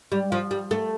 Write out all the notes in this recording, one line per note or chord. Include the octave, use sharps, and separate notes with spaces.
G3
F3
G3
A3